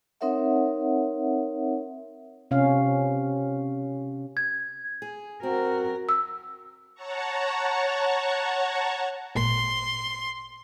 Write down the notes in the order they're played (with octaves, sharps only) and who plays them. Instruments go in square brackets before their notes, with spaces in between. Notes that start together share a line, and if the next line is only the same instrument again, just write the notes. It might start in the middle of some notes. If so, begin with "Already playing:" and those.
[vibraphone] C4 D#4 A#4 C#5 E5 F#5
[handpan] C3 C#4 F5
[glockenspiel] G#6
[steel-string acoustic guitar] G#4
[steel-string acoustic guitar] C4 [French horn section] F#4 [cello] A#4
[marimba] E6
[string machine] C#5 F#5 A5 A#5 C#6
[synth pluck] G#1 A#2 C7 [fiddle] C6